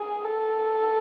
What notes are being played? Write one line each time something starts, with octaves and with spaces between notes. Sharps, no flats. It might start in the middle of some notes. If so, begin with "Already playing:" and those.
Already playing: G#4
A4